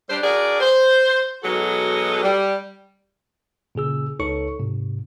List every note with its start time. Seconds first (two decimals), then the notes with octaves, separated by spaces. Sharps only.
0.10 G3 D4 C5
0.23 D4 F#4 G#4 A#4 D5
0.60 C5
1.43 B2 F#3 G#3 D#4 F#4 A4
2.23 G3
3.75 A#2 C#3 G#4 E6
4.19 C#2 D#4 A4 C#5 C#6 C#7
4.59 G#2 C3